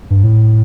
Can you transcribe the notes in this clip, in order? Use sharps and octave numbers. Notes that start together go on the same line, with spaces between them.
G2
A2